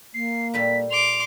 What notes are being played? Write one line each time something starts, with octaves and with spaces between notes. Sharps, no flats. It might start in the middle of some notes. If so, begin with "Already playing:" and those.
A#3 C7
A#2 G3 A4 B6
C6 D6 F7